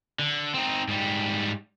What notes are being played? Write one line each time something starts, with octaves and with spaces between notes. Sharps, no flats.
D3
C4 D#4
G#2 G3